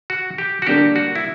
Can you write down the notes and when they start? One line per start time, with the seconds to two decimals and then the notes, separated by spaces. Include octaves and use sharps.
0.10 F#4
0.38 G4
0.62 F#4
0.67 D3 G3 A#3 D4 G4
0.96 F#4
1.15 E4